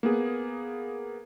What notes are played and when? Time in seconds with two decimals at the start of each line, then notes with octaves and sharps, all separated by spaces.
0.03 A#3 B3 G#4